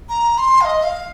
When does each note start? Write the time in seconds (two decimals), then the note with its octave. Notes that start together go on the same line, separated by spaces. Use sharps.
0.09 A#5
0.38 C6
0.61 F5
0.65 D#5
0.83 F5